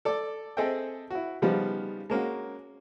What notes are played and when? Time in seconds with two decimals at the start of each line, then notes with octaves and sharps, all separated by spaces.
0.05 A4 D5 D6
0.57 C4 G#4 A4 D#5 E5 G5
1.11 E4 F#4
1.42 C#3 F3 G3 B3 D#4
2.10 G#3 A#3 C#4 F#4